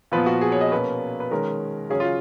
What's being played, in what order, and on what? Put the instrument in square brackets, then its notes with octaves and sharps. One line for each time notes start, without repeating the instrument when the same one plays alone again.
[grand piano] A#2 F3 B3 B4
F#4
G#4
C#5
D#5
B2 A#3 C#4 B4
B4
D#3 G#3 C#4 A#4
C#3 F#3 C#4 G#4
F4